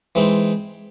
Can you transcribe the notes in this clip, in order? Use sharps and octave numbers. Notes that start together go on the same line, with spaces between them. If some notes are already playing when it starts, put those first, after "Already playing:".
E3 G#3 C4 D#4